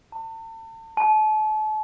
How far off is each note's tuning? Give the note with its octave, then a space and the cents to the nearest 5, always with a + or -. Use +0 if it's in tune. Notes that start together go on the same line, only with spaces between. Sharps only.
A5 +40
A5 -35